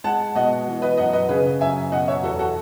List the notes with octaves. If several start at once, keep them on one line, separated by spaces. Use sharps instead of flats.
G#3 F#5 A5
B2 D#5 F#5
E3
B4 D#5
F#2 D#5 F#5
B4 D#5
C#3 G#4 B4
F#2 E5 G#5
B2 D#5 F#5
C#5 E5
E2 F#4 A4
F#4 A4